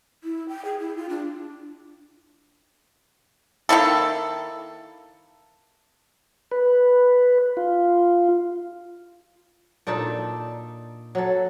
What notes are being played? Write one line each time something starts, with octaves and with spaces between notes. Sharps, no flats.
E4
G5
G#4
E4
F4
D4
D#3 A#3 E4 A4
B4
F4
A#2 D4 D#4 A4
F#3 A4